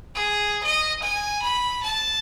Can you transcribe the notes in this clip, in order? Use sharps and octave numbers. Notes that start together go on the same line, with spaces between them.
G#4
D#5
G#5
B5
A5